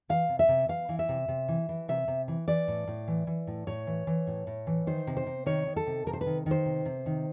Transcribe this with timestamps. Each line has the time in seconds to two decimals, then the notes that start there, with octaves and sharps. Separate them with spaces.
0.09 E3 F5
0.29 C3
0.39 E5
0.49 C3
0.68 E3 F5
0.89 E3
0.99 E5
1.09 C3
1.28 C3
1.48 E3
1.69 E3
1.88 C3 E5
2.08 C3
2.28 E3
2.48 E3 D5
2.68 A2
2.87 A2
3.08 E3
3.27 E3
3.47 A2
3.67 A2 C#5
3.87 E3
4.07 E3
4.27 A2
4.47 A2
4.67 E3
4.87 D#3 C5
5.07 C3
5.17 C5
5.27 C3
5.46 D#3 C#5
5.66 D#3
5.76 A4
5.87 C3
6.06 C3 A#4
6.13 C5
6.21 B4
6.26 D#3
6.46 D#3 C5
6.65 C3
6.85 C3
7.06 D#3